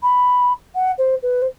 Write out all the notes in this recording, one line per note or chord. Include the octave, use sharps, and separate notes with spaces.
B5
F#5
C5
B4
C5